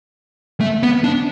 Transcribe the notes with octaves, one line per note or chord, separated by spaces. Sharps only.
A3
B3
D4